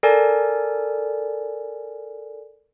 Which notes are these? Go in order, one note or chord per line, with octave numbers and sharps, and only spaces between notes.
A4 A#4 D5 G#5